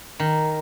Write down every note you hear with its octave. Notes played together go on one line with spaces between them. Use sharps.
D#3